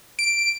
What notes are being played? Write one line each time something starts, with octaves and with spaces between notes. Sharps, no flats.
D7